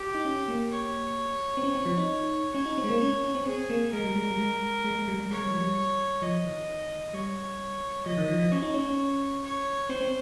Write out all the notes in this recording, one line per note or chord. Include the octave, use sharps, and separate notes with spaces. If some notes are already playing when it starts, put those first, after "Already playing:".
Already playing: G4
D#4
C#4
A#3
C#5
C4
C#4
C4
F3
D#4
C#4 C#5
D#4
C4
G#3
A#3
C#4
C#4
C4
C4 G#4
A#3
G#3 A#4
G3
G#3
G3
G#3
G#3
G#3
G3
G3
G#3 C#5
G3
F3
G3
F3 D#5
D#3
G3 C#5
F3 D#5
D#3
F3
F3
C#4 C#5
D#4
C#4
C#4
C#5
C4 C5
C4